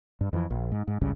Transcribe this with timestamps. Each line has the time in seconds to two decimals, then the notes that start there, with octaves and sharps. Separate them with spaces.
0.21 G2
0.33 F2 E3
0.50 A#1
0.72 G#2
0.88 G#2
1.01 G#1 C#2 G2 C#3